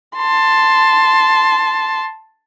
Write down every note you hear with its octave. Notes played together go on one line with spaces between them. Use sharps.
A5 C6